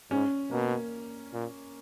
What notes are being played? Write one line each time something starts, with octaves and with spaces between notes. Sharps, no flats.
G#2 C#4
B2 A#3
A#2